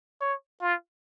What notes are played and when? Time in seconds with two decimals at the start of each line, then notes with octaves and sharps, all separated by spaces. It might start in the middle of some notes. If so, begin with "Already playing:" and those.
0.21 C#5
0.62 F4